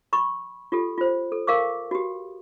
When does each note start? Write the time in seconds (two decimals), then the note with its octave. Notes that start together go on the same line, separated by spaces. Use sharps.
0.13 B5 C#6
0.72 F4 G4 A4
0.98 F4 C5
1.32 A4
1.47 A#4 F5 C#6 D6
1.91 F#4 G4